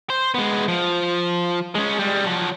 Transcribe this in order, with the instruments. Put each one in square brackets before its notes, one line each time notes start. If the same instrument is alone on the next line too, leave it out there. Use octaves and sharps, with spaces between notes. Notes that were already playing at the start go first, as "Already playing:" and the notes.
[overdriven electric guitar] C5
G#3 B3
F3
G#3 C#4
G3 G#3
F3 F#3